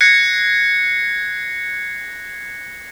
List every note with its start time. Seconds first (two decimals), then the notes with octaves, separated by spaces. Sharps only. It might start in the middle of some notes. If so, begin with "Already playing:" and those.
0.01 F#6 G#6 A#6 C7 C#7